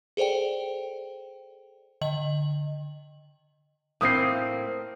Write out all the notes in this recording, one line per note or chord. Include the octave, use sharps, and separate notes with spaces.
G#4 A4 C5 D5 G5
D3 D#5 F#7
A2 A#3 C4 D#6 C7